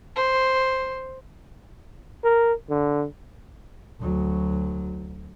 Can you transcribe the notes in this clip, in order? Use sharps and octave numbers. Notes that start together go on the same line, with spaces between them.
C5
A#4
D3
D2 F#3